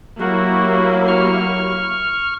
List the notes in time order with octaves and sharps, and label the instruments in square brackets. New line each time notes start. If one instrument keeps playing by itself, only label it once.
[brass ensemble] F#3 [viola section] A#3 E4 G4 [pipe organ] F#4
[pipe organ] C#6 F6